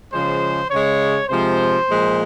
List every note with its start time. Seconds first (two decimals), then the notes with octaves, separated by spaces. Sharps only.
0.12 C#3 F3 G#3 C5
0.70 C#3 G#3 C#5
1.29 C3 F3 G#3 C5
1.88 A#2 F3 G#3